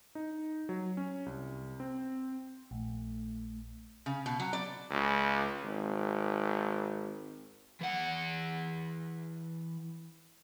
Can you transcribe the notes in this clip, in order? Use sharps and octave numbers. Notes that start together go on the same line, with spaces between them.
D#4
F#3
C#4
C2
C4
A#1 A3
C#3
B2
F#3
D5
C#2
G#1
E3 F#5